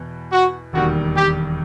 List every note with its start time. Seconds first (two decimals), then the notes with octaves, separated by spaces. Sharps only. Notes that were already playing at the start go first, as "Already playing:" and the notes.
Already playing: E2 B2
0.31 F#4
0.73 E1 D#2 D#3 G3 F#4
1.15 G4